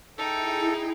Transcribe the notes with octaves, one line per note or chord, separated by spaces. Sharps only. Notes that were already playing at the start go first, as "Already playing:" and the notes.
D#4 E4 G#4 A4 G5